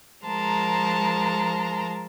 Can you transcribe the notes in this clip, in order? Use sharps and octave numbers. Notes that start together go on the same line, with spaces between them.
F3 G#3 A#4 A5 A#5 C6